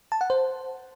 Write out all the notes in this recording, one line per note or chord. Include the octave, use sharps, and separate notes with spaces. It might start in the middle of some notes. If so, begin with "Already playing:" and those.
A5
F#5
C5